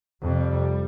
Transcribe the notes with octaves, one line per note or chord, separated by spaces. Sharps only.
F2 C3 G3